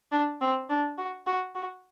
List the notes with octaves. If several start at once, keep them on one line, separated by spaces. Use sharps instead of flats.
D4
C4
D4
F#4
F#4
F#4